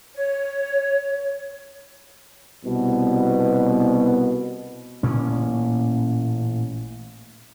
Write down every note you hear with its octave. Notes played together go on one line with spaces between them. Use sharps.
C#5
C2 B2
A1 A#2 C#4